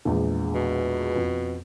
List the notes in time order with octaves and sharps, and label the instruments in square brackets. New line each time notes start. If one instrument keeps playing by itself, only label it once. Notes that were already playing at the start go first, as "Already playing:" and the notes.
[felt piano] A#1 E2 G#3
[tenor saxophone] B2
[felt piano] F2